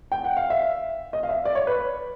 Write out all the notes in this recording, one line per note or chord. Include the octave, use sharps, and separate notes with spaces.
G5
F#5
F5
E5
D#5
F5
E5
D5
C#5
B4